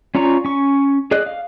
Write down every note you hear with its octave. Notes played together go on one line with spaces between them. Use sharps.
C#4 F4 D5 A#5 C#6
C#4 C#6
G#4 D5 D#5 F#6
F5